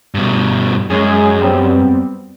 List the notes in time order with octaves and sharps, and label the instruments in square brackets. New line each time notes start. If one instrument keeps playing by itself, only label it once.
[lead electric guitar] G2 B2
[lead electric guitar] F#2 [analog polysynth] G#3 C#4 G#4
[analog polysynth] G3 B3 C4